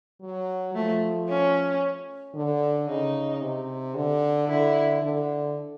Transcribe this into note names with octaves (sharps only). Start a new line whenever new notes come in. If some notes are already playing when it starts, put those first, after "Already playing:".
F#3
F3 A3
C#4
D3
C#3 D#4
C3
D3
D3 E4
D3